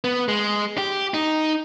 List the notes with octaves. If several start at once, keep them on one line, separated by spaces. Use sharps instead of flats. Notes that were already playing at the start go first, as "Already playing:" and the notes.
B3
G#3
G4
D#4